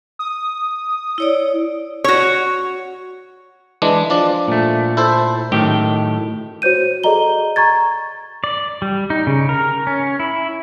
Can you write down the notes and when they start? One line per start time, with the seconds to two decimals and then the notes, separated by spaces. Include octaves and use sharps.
0.19 D#6
1.18 E4 C#5 D5
2.04 F#4 C#5
3.82 E3 G#3 D4
4.10 F3 D4 D5
4.48 A#2 A3
4.97 E4 A4 C5
5.52 F#2 A2 D#3 G4
6.62 F#4 C5 C#5 G6 D#7
7.04 G#4 A4 D5 D#5 A#5 G7
7.56 A#5 C#6 G#6 A6
8.44 D5
8.82 G3
9.10 D#4
9.27 C#3
9.49 A#4
9.87 C#4
10.20 E4